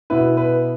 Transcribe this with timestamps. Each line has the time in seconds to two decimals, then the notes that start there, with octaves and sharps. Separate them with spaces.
0.10 B2 B3 E4 B4
0.37 B4